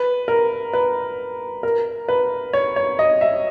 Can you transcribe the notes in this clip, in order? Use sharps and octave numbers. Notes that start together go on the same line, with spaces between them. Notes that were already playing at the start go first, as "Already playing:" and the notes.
Already playing: B4
A#4
B4
A#4
B4
C#5
C#5
D#5
E5